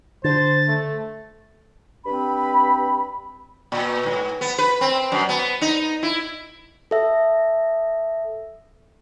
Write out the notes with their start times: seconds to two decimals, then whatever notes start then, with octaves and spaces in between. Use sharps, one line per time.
0.24 D3 C5 A6
0.68 A3
2.06 G2 C4 B5
3.72 A#2
4.06 G#2
4.41 B3
4.58 B4
4.81 C4
5.12 F#2
5.29 B3
5.61 D#4
6.03 E4
6.91 A4 E5